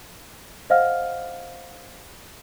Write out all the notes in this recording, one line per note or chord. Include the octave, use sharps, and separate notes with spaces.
C5 D#5 F5 F#5 F6